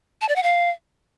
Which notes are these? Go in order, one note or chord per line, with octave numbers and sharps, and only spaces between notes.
A5
D5
F#5
F5